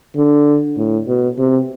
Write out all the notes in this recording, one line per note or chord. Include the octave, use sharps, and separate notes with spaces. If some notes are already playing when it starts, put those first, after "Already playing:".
D3
A2
B2
C3